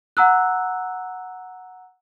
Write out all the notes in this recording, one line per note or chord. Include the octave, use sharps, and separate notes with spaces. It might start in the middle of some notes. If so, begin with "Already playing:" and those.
F#5 A#5 E6 F#6